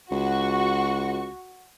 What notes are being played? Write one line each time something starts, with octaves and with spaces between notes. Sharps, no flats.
C#2 F#4 C#6